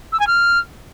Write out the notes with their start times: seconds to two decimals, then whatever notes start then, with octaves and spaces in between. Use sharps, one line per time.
0.12 E6
0.19 G#5
0.27 F6